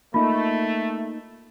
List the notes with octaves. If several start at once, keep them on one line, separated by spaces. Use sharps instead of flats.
A3 A#3 D#4 F4